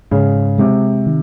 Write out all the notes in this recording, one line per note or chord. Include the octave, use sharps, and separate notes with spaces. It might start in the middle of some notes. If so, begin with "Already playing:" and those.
G#2 C#3
C3 G#3
D#3